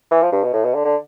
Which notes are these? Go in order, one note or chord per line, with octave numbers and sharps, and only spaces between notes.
E3
F3
G2
B2
A2
B2
D3
D3